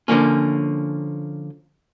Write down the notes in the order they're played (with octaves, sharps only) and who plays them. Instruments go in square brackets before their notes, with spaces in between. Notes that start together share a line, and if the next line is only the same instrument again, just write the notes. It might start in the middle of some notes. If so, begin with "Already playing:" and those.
[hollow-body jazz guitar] D3 F3 A#3 C#4